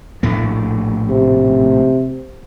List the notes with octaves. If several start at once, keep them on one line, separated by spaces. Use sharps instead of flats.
A#1 A2 A3
C3